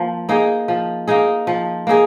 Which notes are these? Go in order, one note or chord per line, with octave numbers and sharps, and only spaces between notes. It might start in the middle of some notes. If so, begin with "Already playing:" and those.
Already playing: F3 A#3
A#3 D#4 G#4
F3
A#3 D#4 G#4
F3
A#3 D#4 G#4